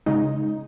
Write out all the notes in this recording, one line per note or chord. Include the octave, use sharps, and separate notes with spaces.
C#3 G#3 D#4